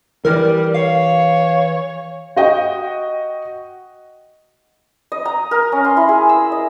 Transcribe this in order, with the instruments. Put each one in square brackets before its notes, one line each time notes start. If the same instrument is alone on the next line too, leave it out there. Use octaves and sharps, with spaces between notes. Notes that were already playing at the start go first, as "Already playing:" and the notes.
[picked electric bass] E3 [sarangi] G3 [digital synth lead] A#4
[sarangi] C#5 [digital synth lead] F5
[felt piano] F#4 D#5 G5
[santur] D#5
A#5
A#4
C#4
C6
E4
G#4
E6
D#5